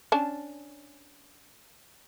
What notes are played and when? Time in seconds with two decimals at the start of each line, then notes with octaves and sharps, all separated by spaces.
0.12 C#4 D4 A5